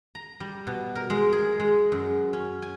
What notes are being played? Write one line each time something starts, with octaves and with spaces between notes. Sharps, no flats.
A#5
G3
B2
A#4
G#3
G#4
G#3
F#2
C#4
G#5